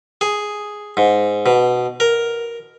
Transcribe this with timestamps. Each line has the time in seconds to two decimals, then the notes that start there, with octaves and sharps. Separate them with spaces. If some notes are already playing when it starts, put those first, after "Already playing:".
0.21 G#4
0.97 G#2
1.46 B2
2.00 A#4